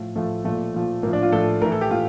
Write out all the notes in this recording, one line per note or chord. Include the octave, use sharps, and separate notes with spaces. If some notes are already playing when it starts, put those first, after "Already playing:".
Already playing: A2 F3
A2 F3 A3
A#2 F3 A3
A#2 F3
A2 F3 A#3
D4
F4
A2 F3 A4
A2 E3 A#4
A4
G4
A2 F4